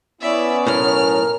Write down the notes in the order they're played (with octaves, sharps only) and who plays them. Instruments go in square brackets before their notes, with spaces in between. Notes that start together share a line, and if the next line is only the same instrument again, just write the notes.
[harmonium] B3 C#4 [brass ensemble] E4 [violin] D5 E5
[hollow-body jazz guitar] B1 A2 [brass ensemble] A#4 [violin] F6